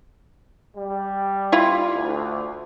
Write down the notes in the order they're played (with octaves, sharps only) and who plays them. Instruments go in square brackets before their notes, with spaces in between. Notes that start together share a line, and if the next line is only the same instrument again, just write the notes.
[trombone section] G3
[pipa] E4 F4
[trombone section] D2